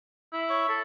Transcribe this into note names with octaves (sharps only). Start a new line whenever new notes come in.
E4
C#5
A4